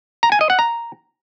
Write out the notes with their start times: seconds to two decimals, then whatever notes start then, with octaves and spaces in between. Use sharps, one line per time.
0.23 A#5
0.32 G#5
0.41 D#5
0.50 F#5
0.59 A#5